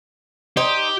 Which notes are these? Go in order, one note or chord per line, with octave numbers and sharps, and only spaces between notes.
D#4 G4 C5